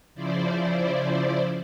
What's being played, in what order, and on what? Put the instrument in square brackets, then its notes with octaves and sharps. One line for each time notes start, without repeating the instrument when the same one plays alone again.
[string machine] C#3 F3 E4 C5 D5